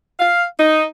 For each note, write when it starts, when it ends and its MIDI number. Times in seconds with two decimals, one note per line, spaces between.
0.20 0.44 77
0.59 0.83 63